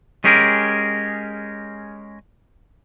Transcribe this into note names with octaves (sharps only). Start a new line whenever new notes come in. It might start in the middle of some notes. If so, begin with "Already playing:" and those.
G#3 C#4 G4 G#4 A#4